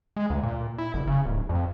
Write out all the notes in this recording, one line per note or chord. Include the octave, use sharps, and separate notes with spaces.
G#3
D2
A#2
E4
F#1
C#3
D1
F2